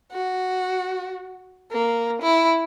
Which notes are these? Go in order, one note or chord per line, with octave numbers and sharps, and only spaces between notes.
F#4
A#3
E4